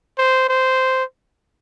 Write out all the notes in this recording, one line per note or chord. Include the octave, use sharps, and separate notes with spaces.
C5
C5